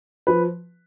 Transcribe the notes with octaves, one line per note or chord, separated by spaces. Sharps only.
F3 B4